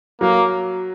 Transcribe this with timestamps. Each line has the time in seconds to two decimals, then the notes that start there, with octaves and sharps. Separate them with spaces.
0.21 F#3 A#3